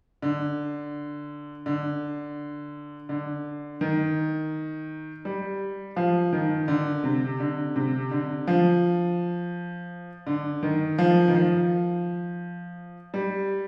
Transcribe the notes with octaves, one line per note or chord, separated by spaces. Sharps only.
D3
D3
D3
D#3
G3
F3
D#3
D3
C3
D3
C3
D3
F3
D3
D#3
F3
D#3
F3
G3